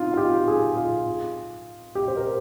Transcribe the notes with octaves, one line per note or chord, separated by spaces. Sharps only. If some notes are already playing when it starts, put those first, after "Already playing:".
Already playing: C4 D#4 F4
F4
G4
G#4
F4
G4
C5
A#4